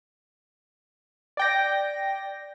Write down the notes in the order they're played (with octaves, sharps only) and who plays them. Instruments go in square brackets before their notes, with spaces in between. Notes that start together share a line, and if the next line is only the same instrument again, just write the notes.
[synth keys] D5 G5 A#6